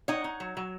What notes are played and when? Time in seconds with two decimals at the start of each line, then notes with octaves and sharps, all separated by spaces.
0.08 D#4 C#5 F#5
0.24 D#4
0.40 F#3
0.57 F#3